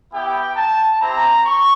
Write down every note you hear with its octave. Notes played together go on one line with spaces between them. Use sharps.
B3 E4 G4 G5
A5
C4 E4 G4 A#5
C#6